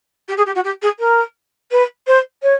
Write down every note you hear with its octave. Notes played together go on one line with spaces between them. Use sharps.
G4
G#4
G4
F#4
G4
G#4
A#4
B4
C5
C#5